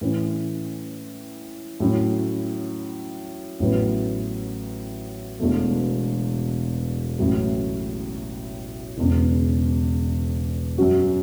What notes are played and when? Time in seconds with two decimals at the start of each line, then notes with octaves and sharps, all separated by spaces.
0.01 A2 E3 C#4
1.80 A2 F#3 C#4 E4
3.60 A1 A2 F#3 B3
5.40 E1 E2 B2 A3
7.19 A1 A2 F#3
8.98 E1 E2 C#3
10.78 F#2 F#3 C#4 F#4